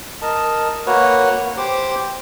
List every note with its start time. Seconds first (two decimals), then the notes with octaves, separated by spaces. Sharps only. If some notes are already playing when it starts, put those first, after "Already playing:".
0.22 A#4 D#5 A5
0.86 A#3 F#4 B4 C#5
1.57 G4 C5 D6